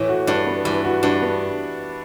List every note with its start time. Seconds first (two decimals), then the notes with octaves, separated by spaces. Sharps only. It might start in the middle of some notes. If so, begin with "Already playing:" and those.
Already playing: A2 E3
0.09 F#4
0.27 G2 D4
0.46 B3
0.65 G2 E3
0.85 F#4
1.03 G2 D4
1.22 B3